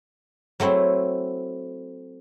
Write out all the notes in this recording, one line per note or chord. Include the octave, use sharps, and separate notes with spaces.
F#3 A3 C4 E4 C5